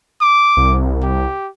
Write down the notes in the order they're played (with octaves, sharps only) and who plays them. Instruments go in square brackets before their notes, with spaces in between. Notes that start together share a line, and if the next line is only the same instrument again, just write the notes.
[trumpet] D6
[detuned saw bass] C2
[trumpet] G4